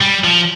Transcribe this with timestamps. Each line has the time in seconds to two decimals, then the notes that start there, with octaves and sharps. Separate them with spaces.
0.01 G3
0.24 F3